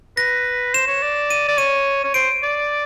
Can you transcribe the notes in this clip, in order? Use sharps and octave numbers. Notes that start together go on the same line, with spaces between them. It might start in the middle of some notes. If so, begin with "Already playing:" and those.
B4 A#6
C5 E7
C#5
D5
D#7
D5
C#5 D#7
C#5
C5 D7
D5